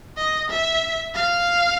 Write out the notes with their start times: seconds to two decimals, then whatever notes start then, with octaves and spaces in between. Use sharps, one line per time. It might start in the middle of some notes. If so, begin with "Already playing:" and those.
0.17 D#5
0.50 E5
1.14 F5